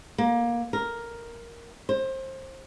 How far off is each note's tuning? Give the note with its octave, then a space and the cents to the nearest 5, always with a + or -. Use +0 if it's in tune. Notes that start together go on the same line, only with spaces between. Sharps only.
A#3 +20
A#4 +5
C5 +25